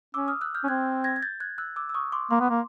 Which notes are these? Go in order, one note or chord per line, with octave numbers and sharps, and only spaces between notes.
C#4 D6 E6
D#6 F6
E6 F#6
F6 G6
C#4
C4 F#6 G#6
G#6 A#6
G#6
G6 A6
F#6 G#6
E6 F#6
D6 E6
E6
C#6 D#6
C6 D6
A#3 C6 D6
B3
A#3